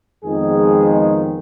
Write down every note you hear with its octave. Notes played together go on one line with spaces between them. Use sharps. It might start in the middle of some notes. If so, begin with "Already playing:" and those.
F2 D#3 G#3 B3 G#4